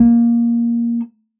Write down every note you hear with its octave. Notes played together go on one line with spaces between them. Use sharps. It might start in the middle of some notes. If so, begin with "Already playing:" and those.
Already playing: A#3